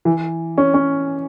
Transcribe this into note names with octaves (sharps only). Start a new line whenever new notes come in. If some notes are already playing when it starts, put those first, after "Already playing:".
E3
C#4
C#4